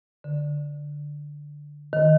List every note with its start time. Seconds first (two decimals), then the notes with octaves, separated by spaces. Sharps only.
0.24 D3
1.93 D#3